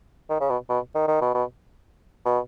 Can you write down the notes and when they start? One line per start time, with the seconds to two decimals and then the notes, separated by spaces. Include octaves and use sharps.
0.30 D#3
0.40 C#3
0.50 B2
0.70 B2
0.95 D#3
1.08 D#3
1.21 B2
1.34 B2
2.25 B2